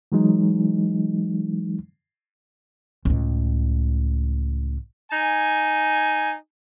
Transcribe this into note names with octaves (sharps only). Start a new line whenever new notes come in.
E3 F#3 G#3 D#4
C#2 A2
D#4 G#5